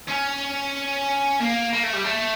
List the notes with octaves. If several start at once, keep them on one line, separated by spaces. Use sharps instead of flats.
C#4
A#3
A#3
A3
G3
A3